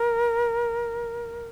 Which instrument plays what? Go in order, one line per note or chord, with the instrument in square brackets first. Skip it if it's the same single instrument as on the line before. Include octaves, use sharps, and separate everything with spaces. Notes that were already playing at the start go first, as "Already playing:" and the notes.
Already playing: [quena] A#4